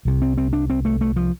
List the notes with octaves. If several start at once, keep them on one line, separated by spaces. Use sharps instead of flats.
C2 C3
C4
C4
D4
C4
A3
A3
F3